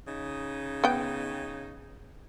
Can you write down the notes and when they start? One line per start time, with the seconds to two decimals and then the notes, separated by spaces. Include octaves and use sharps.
0.08 C#3 D#4
0.84 B3 G5